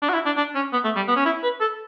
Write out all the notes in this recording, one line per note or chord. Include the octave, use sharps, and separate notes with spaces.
D4
F#4
E4
D4
D4
C#4
B3
A3
G3
B3
C#4
E4
B4
A4